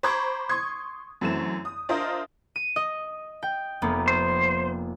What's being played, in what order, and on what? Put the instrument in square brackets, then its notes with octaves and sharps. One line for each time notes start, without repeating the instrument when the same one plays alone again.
[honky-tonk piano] C5 A#5 B5 C#6 D6 G#6
C6 C#6 D#6 G#6
F#2 E3 A3 C4 E7
D#6
D4 F4 A#4 C5 D#5 E5
[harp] D#7
D#5
G5
F1 A#3 B3
[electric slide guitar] C5